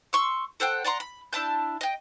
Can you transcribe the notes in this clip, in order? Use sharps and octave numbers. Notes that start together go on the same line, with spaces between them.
C6 C#6 E6
A4 C5 F#5 G5
D5 F#5 A#5 C6
B5
D4 E4 A5 G6
D#5 G5